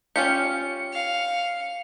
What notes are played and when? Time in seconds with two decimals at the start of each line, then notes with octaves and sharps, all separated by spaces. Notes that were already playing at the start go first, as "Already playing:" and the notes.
0.16 C#4 F4 G4 C#7
0.94 F5